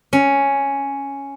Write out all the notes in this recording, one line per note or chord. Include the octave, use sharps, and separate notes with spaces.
C#4